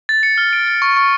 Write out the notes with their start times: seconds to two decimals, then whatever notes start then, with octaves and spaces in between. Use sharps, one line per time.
0.09 A6
0.23 C#7
0.38 F6
0.53 D7
0.67 A6
0.82 C#6
0.97 C#6